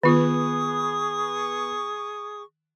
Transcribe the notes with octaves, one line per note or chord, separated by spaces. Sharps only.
D#3 B3 F4 G#4 C#6 D#6